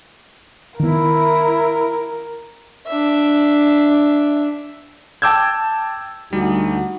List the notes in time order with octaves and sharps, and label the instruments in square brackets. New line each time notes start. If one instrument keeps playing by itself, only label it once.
[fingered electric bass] D#3 B3 [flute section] E4 [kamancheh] A#4
[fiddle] D4 E5
[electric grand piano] G5 A5 D6 E6 G6 G#6
[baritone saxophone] D2 [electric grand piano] G3 [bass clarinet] D#4 [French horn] F#4